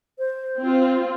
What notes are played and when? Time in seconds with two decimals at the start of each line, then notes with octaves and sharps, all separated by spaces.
0.19 C5
0.59 C4 F4